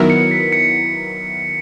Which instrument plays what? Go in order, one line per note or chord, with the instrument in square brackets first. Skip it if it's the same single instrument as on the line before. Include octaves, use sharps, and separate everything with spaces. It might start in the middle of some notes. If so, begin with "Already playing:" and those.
Already playing: [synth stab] D#3 F#3 B3 E4 A#4
[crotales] C#7
B6
C#7